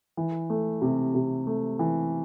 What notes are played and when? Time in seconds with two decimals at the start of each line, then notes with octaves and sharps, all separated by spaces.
0.17 E3
0.50 A3
0.82 C3
1.15 C3
1.47 A3
1.79 E3